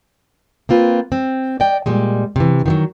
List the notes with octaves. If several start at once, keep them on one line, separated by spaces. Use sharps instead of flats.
A#3 C4 F4 B4
C4
D5 D#5 G5
A#2 G3 G#3
C3 E3
D#3 F3 F#3